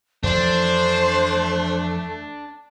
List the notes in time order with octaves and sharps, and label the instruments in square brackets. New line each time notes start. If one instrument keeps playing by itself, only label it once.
[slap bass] F2 E3 F3 [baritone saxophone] A3 [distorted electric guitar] D4 [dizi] C5